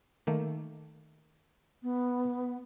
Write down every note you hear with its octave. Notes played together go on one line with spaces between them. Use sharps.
D#3 A3 A#3
B3